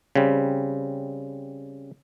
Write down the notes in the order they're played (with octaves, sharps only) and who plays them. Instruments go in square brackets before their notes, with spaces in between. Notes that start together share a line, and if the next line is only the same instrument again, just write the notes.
[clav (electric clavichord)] C#3 G3 C4